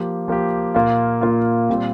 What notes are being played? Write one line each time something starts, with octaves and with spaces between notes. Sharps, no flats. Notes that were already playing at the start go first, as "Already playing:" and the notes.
Already playing: F3 A#3 G4
F3 A#3 G4
A#2 A#3 F4
A#2 A#3 F4
A#2 G3 C4 F4